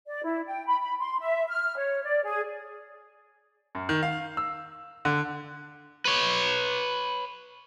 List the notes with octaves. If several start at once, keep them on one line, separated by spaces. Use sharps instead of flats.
D5
E4
G5
B5
B5
C6
E5
F6
C#5
D5
G#4
F#2
D#3
F5
E6
D3
B4 C#5